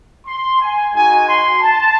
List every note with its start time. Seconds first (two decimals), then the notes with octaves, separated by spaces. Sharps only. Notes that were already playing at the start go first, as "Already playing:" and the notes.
0.27 C6
0.61 G#5
0.94 G#3 D#4 F#4 G#5
1.28 C6
1.62 A5